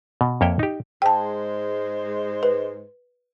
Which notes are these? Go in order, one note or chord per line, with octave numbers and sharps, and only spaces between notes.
B2
F2 A#3 C#5 E5 G5
D#4 G4
G#2 G#3 C5 G5 A5
B4